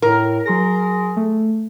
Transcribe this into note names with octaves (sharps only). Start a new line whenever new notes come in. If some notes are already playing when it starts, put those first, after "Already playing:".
A2 A#4
F#3 G#4 C6 A#6
A3